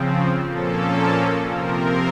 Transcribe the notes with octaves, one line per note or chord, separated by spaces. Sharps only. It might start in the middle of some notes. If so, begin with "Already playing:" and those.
Already playing: C#3 F3 C4
A#2 F3 A#3 C#4 A4
C3 F3 C4 A#4